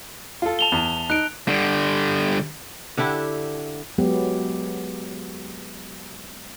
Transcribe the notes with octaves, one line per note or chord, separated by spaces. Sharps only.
F4 A4
A5 F7 G7
E2
D#4 F#6 D7
D3 G3
D3 D4 E4 G4
F#3 G#3 B3 G4